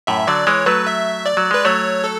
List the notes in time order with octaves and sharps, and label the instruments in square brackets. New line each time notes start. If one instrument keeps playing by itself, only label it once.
[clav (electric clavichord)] F#2 A2 [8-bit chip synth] E5
[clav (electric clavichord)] D3 F#3 [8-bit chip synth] D5
[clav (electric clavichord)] E3 G#3 [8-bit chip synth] C#5
[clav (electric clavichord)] F#3 A3 [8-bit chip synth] B4
[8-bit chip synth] E5
D5
[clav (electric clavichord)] F#3
[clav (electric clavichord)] G#3 [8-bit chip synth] B4
[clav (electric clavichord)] F#3 A3 [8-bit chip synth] C#5
[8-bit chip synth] A4